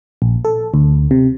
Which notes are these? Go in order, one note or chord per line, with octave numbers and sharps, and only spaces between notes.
A#1
A4
D2
C3